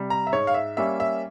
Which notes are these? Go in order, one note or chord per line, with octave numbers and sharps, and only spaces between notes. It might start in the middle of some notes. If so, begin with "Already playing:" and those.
Already playing: C3 G3
A#5
E5
G#2 C#5
F5
E5
G3 A#3 C#4 E5
E5